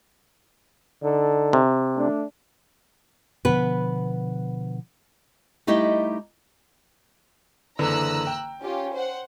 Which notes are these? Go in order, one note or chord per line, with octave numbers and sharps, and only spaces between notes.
D3 D#4 A4
C3
A3 D4
B2 D3 F3 B3 B4
G3 A3 D#4 E4 G4 D#5
F#1 D3 E3 A#5 E6 F#6
G5
C#4 F4 G4
C5 F#5